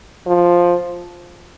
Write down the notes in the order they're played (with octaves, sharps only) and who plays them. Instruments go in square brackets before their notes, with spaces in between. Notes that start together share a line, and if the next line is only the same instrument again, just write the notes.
[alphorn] F3